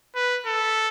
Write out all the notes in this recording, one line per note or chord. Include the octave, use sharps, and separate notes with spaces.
B4
A4